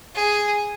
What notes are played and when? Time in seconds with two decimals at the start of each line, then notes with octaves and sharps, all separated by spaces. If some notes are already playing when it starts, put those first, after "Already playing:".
0.15 G#4